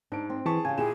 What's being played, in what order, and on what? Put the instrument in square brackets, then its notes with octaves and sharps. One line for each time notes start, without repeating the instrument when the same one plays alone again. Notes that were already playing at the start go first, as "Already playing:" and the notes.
[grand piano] G#2 D7 [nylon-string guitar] D4
[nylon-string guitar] C4
[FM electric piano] E3 [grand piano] G#4 A5 C#6
[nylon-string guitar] C#3 G4 [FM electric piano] G#5
[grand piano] A#2 E7 [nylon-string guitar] E4 G4 [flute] G#4